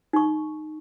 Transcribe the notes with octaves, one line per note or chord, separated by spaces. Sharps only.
D#4 C#6